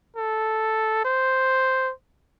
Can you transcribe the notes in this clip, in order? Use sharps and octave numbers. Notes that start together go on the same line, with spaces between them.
A4
C5